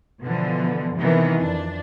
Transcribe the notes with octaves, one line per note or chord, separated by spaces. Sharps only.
B2 D3 E3 F3
C3 D#3 E3 B3
F2 D4